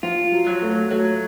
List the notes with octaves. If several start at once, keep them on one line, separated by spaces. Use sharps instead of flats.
F3 F4
F#3
F#3
A3
F#3 A3